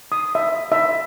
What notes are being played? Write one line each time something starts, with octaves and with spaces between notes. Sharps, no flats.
D#6
E5
E5